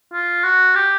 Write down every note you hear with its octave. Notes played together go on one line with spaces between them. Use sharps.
F4
F#4
G4